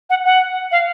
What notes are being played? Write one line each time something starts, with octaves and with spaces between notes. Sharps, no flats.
F#5
F#5
F5